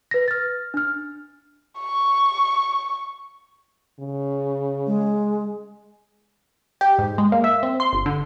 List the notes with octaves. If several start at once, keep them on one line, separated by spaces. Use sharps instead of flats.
B4 A#6
F6 A6
D4 F6
C#6
C#3
G#3
G4
G#2
G#3
A#3
E5
C4
C6
G1
D3